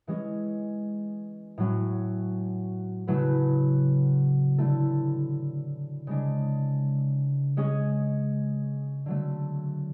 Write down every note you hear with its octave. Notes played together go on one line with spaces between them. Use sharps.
E3 G#3 C#4 G#4
A2 F#3 C#4
C#3 F#3 A3 E4 B4
D3 A3 E4 A4
C#3 G#3 D4
G#3 C#4 G#4
D3 F#3 A3